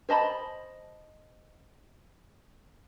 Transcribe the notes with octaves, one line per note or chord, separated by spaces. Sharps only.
C5 D#5 A5 B5